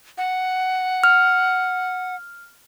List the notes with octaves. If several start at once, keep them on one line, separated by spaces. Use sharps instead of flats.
F#5
F6